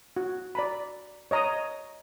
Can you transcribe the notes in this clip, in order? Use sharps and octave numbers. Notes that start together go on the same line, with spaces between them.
F#4
D5 A#5 B5
C#5 D#5 A#5 D#6